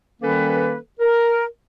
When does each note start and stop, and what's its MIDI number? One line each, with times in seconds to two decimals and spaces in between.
0.21 0.76 51
0.21 0.76 55
0.21 0.76 58
0.21 0.76 61
0.21 0.76 69
0.21 0.76 71
0.99 1.43 70